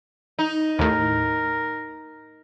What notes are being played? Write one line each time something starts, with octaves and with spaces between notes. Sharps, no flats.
D#4
D#2 A2 A#4